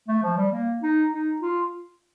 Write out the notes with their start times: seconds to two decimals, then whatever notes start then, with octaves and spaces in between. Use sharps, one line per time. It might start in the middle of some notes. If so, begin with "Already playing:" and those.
0.08 A3
0.23 F3
0.37 G3
0.52 A#3
0.83 D#4
1.12 D#4
1.42 F4